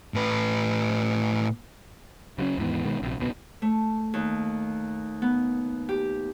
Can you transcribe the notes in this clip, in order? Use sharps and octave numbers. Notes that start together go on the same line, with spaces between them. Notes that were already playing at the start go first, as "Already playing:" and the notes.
A2 B4
C#3 F#3 G3 C#4
D#2 G#2 E3 B3
B2 D#3 G#3 B3
A#1 C3
D1 B1 B2 B3
A3
D#2
B3
G4